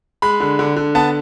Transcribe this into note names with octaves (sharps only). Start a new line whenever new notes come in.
G#3 B5
D3
D3
D3
B3 A5